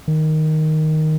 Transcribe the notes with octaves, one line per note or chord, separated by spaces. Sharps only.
D#3